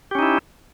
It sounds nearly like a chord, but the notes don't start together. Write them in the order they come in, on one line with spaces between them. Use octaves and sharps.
G4 C#4 D#4 E4